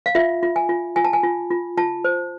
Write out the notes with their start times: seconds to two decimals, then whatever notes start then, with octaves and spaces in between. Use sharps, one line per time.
0.06 F5
0.15 F4 E5
0.43 F4
0.56 G#5
0.69 F4
0.96 F4 G#5
1.04 A5
1.13 G#5
1.23 F4
1.51 F4
1.77 F4 A5
2.04 C5